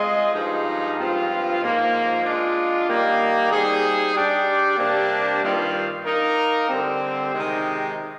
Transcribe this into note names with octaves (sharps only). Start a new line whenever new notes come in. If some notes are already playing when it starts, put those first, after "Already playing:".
Already playing: G#3 C4 F4 G#4 D#5
G2 F3 G#3 D#4
G2 F3 C4 F4
G#2 F3 A#3
G#3 D4 F4
D#3 G3 A#3
G3 C4 D#4 G#4
G3 D4 G4 D5
C3 G3 A#3 D4
G2 D#3 G3 C4 F4
A#3 D#4 A#4
D3 G3 C4
C3 D#3 G#3 D#4